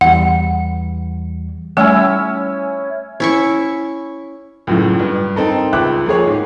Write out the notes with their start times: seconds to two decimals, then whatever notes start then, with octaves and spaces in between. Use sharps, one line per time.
0.01 E2 E3 G3 F#5
1.77 G3 A3 C#4 E4 G#5 E6
3.20 C#4 E4 C#6
4.67 C#2 F#2 A2
4.99 G2
5.36 C4 D#4 A4 A#4
5.72 C#2 E5 D6 F#6
6.06 F3 A#3 G#4 C#5
6.27 G#2